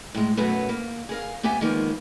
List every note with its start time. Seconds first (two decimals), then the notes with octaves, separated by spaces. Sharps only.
0.14 A2 G#3
0.37 F#2 B2 F#3 A3 B3
0.69 A#3
1.09 G#4 A#4 F5
1.43 A#3 B3 G4 E5 G#5
1.61 D#3 F3 G#3 A#3 B3